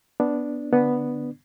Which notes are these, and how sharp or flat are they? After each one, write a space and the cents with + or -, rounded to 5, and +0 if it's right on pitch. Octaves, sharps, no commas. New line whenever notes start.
B3 +0 D4 -5
D3 +0 B3 +0 D4 +5